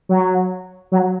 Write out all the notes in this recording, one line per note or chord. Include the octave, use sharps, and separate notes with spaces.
F#3
F#3